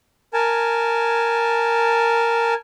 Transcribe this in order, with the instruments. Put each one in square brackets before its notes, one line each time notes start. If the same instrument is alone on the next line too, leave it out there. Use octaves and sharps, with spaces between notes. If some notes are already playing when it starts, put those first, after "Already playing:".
[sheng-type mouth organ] A#4 G#5 A5